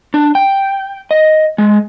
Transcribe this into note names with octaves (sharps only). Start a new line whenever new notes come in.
D4
G5
D#5
G#3